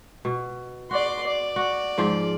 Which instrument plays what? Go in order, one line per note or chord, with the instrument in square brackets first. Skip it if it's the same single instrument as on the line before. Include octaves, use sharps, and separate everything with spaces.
[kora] B2
[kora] F#4 [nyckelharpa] D5 C6
[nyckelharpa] D5
[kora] F#4
G#2 F3 F4